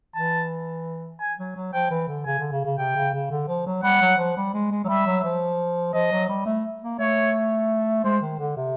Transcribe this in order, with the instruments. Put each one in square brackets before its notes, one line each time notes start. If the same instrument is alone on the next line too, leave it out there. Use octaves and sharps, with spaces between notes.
[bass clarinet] E3 [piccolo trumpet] A5
[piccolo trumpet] G#5
[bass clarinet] F#3
F#3
[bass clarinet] F3 [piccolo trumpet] G5
[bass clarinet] E3
D3
[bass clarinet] C#3 [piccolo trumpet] G#5
[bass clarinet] D3
C#3
C#3
[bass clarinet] C3 [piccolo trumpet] G5
[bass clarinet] C#3
C#3
D3
F3
F#3
[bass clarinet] G3 [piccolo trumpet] F#5
[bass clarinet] F#3
F3
G3
G#3
G#3
F#3
[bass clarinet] G3 [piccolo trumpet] E5
[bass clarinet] F#3
F3
[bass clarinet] F3 [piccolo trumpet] D#5
[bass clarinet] F#3
G3
A3
A#3
[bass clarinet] A3 [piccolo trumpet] C#5
[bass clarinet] G#3 [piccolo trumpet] C5
[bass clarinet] D#3
D3
C3